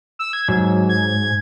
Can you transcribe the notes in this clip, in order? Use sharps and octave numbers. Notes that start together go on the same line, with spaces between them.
E6
G#6
G#2 F#3
G#6